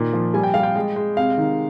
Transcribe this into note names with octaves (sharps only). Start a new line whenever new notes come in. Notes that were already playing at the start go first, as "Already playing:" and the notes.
Already playing: A#2 D#3
F3
G3 G#5
G5
G3 F5
G5
G#3
G#3
C3 F5
D#3